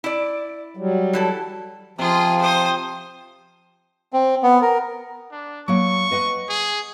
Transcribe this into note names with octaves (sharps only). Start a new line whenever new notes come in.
E4 D5
F#3 G3
E3 E4 A4
C3 F3 F4 G#4
C5 D#6
C4
B3
A#4
D4
F#3 A#3 C#6
B4 D#5 F#5
G#4